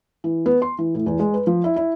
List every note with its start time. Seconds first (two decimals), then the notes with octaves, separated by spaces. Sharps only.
0.24 E3
0.46 B3
0.62 C6
0.78 E3
0.95 A2
1.06 E2
1.19 G#3
1.34 B4
1.47 F3
1.64 E4
1.76 E4